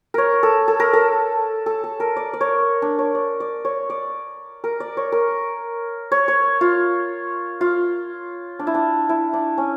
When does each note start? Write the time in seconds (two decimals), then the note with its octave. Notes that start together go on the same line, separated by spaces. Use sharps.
0.14 A#4 C#5
0.43 A4
0.68 A4
0.80 A#4
0.93 A4
1.66 A4
1.84 A4
2.00 A#4
2.17 D5
2.33 D5
2.41 C#5
2.82 D4
2.99 C#5
3.15 D5
3.40 D5
3.65 C#5
3.90 D5
4.64 A#4
4.80 D5
4.97 C#5
5.12 A#4
6.12 C#5
6.28 C#5
6.61 F4
7.61 F4
8.59 D4
8.67 E4
8.74 D4
9.09 E4
9.33 D4
9.58 C#4